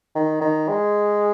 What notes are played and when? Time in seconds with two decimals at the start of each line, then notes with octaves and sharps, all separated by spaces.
0.15 D#3
0.41 D#3
0.69 G#3